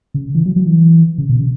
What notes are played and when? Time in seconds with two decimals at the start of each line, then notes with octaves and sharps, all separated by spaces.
0.14 C#3
0.35 E3
0.46 F#3
0.56 F#3
0.66 E3
1.18 C#3
1.29 B2
1.39 C#3